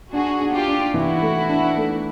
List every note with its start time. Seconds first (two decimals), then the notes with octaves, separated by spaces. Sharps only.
0.13 D4 F#4 G#4
0.41 D4
0.54 F4 G4
0.68 D4
0.94 E3 E4 F#4
1.22 A3
1.49 D4
1.77 A3